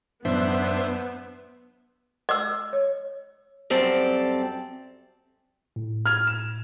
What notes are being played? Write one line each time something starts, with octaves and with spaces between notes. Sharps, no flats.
F#2 A2 E3 B3 D4 C5 E5
D#5 E6
C#5
F#2 G3 C4 A4 D5
A2
F6 G#6 F7
E7